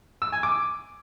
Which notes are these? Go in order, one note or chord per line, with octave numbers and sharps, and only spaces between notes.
E6
G#5
D6